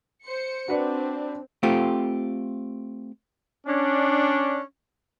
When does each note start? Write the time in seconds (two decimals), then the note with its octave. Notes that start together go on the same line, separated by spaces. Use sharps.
0.24 C5 C#7
0.68 C4 D4 F#4 B4 D5
1.63 A3 C4 F4 G4
3.67 C#4 D4